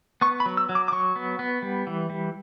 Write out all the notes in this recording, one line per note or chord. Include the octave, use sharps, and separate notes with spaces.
B3 C#6
B5
F#3
E6
F#3
D6
D6
F#3 C#6
B3
B3
G3
E3
G3